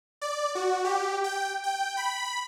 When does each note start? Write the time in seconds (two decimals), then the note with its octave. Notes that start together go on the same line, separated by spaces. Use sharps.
0.21 D5
0.55 F#4
0.84 G4
1.24 G5
1.64 G5
1.97 B5